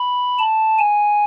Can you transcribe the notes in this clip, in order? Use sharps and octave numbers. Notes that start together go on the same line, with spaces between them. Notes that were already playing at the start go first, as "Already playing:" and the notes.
Already playing: B5
A5
G#5